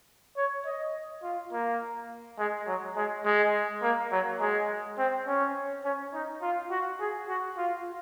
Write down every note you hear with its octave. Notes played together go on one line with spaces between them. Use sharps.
C#5
D#5
F4
A#3
G#3
F#3
G#3
G#3
A#3
F#3
G#3
C4
C#4
C#4
D#4
F4
F#4
G#4
F#4
F4